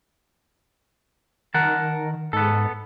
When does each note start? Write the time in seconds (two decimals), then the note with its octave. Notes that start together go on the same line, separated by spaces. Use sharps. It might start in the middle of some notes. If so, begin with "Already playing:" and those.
1.54 D#3 A#4 F#5 A5
2.33 G#2 B3 A4